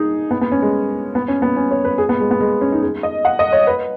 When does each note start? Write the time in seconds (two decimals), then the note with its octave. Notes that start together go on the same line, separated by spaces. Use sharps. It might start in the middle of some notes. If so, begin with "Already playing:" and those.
Already playing: D#4 G#4
0.31 B3
0.41 B3
0.52 C#4
0.62 G#3
1.15 B3
1.28 C#4
1.42 B3
1.56 C#4
1.71 C#5
1.85 B4
1.98 G#4
2.09 B3
2.20 G#3
2.31 B3
2.40 G#3
2.61 C#4
2.72 D#4
2.82 G#4
3.03 D#5
3.25 F#5
3.39 D#5
3.52 C#5
3.67 B4